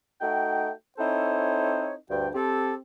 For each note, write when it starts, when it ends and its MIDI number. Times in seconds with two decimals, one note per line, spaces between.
0.21 0.70 57
0.21 0.70 63
0.21 0.70 66
0.21 0.70 79
0.99 1.95 60
0.99 1.95 63
0.99 1.95 64
0.99 1.95 69
0.99 1.95 72
0.99 1.95 73
2.10 2.28 38
2.10 2.28 43
2.10 2.28 79
2.34 2.75 60
2.34 2.75 67
2.34 2.75 69